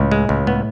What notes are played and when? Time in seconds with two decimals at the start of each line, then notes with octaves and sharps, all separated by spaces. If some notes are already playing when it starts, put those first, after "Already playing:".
Already playing: C#2 A2
0.12 G#3
0.29 C#2
0.47 A2 B3